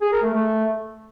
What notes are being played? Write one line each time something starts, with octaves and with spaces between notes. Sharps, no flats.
G#4
A#4
A3
A3